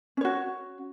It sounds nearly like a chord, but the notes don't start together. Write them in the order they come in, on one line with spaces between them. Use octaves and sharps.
C#4 C#5 F#4